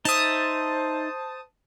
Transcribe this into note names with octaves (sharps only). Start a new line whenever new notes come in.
D#4 C5 E5 A5 D#6